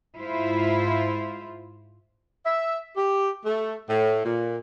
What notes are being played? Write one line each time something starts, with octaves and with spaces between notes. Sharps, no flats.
G#2 E4 F4 C5
E5
G4
A3
A2
A#2